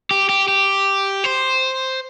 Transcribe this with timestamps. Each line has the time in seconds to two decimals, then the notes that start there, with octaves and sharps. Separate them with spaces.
0.11 G4
0.29 G4
0.48 G4
1.24 C5